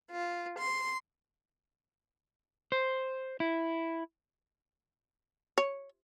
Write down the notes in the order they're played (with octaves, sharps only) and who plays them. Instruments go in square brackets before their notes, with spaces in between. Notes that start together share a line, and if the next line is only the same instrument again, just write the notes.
[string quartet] F4
C6
[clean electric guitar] C5
E4
[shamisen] C#5